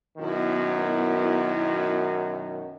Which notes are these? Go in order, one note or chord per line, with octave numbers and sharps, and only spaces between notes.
F#2 B2 D#3 B3 E4